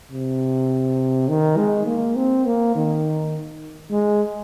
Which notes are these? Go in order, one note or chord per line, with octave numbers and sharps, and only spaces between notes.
C3
D#3
G#3
A#3
C4
A#3
D#3
G#3